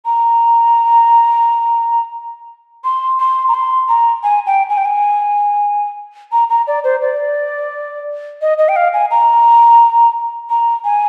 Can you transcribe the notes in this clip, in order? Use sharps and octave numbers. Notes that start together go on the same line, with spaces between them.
A#5
C6
C6
A#5
C6
A#5
G#5
G5
G#5
G5
G#5
A#5
A#5
D5
C5
D5
D#5
D#5
G5
F5
G#5
A#5
A#5
G#5